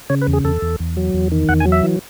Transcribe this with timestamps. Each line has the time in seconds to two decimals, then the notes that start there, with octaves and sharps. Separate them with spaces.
0.10 C#3 C#5
0.22 B4
0.27 E2
0.33 G#4
0.44 E2 A4
0.62 E2
0.80 E2
0.97 F#3
1.14 E2
1.32 D#3
1.49 E2 F#5
1.60 G#5
1.66 F#3
1.72 E5
1.83 E3